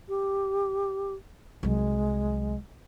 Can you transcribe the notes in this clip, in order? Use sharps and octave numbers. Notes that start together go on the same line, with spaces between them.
G4
C2 F#3 G#3